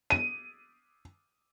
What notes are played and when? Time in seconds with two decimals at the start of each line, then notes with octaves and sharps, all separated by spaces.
0.10 D#7